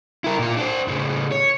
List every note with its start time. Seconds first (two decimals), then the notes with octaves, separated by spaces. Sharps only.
0.24 E4 A#4
0.39 A#2 F4
0.57 D4 C5
0.88 A2 C#3
1.32 C#5